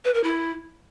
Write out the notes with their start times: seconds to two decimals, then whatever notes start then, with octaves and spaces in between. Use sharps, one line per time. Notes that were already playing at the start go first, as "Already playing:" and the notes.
0.05 B4
0.14 A#4
0.24 E4